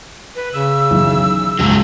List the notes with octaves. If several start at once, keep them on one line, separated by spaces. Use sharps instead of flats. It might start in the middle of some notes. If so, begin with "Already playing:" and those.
B4
C#3 E6
B1 D#3 E3
C#2 G#2 C#3 F#3